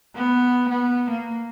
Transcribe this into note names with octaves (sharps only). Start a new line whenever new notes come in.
B3
B3
A#3